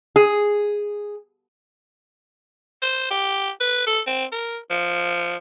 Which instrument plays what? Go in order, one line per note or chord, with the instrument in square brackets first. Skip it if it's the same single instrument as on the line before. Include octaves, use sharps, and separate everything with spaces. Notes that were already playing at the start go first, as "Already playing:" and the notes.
[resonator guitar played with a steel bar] G#4
[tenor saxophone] C5
G4
B4
A4
C4
A#4
F3